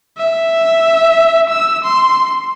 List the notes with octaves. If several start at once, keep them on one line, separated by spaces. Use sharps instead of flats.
E5
E6
C6